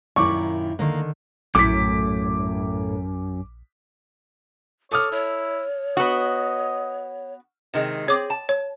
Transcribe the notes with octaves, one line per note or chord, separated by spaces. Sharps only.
F#2 A#2 D#3 E4 C#6 D6
D3 D#3 A#3 D#5
A#1 F#2 A2 D6 B6
A4 C#5 D6 D#6 F6
E4 C#5
B3 F#4 D#5
C3 D#3 G#3
C4 G#4 C#5 D6
A5
C#5